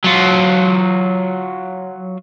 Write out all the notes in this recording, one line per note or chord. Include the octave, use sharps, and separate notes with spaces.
F#3 F4